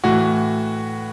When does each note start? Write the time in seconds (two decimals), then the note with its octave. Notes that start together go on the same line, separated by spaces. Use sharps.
0.04 A2 E3 F#4